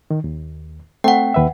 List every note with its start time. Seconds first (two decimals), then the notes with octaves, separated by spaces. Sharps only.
0.10 D#3
0.24 D#2
1.04 A3 C4 F#5 G5
1.34 D#2 B4 E5